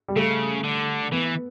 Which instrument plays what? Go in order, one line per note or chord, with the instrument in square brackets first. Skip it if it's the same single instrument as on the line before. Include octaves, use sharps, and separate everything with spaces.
[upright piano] G3
[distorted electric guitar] C#3 [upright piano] A3
[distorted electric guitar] D3
[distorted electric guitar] E3 [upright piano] B3